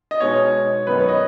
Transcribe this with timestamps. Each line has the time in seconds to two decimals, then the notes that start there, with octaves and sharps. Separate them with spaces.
0.11 D#5
0.20 B2 G#3 D#4 C#5
0.87 F#2 D#3 B3 D#4 B4
0.98 C#5
1.09 D#5